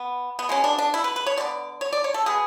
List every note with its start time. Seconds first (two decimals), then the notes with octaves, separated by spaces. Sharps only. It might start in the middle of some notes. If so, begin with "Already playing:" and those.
Already playing: B3
0.39 B3
0.49 B2 G#3 B3 C#4
0.64 D4
0.78 D4
0.94 E4
1.04 B4
1.16 B4
1.26 C#5
1.38 D3 G#3 B3 D5
1.81 C#5
1.93 D5
2.04 C#5
2.14 A4
2.26 B2 G#3 B3 G#4